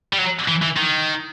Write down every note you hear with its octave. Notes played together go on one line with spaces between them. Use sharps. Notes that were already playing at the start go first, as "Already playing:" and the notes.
G3
F#3
E3
E3
D#3